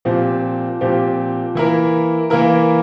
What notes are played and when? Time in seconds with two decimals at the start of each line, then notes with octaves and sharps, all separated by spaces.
0.05 A#2 F3 C4 G4
0.81 A#2 F3 C4 G4
1.55 E3 A#3 E4 A#4
2.30 E3 A#3 E4 A#4